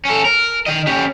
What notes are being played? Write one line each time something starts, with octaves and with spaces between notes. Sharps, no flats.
C#4 A4
A#4
D#3 D#5
C#4 G4